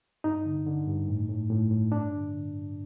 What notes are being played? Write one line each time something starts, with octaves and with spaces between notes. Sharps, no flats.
G2 D#4
D3
D3
G2
A2
A2
A2
A2
G2 D4
D3
D3
G2